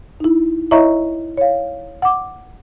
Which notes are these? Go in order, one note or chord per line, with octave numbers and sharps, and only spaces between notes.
D#4 E4
E4 C#5 D#5 E5 A#5 C#6
C#5 F5
F#5 D6